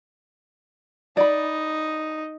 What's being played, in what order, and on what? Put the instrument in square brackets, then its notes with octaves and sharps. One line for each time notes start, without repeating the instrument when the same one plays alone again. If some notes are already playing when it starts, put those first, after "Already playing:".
[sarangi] D#4 [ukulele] D5 B5